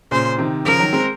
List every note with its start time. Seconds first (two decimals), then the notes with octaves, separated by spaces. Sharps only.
0.11 A#2 C#3 C5
0.38 C3 D#3
0.65 C#3 F3 A#4
0.79 D#3 F#3
0.93 G#3 C4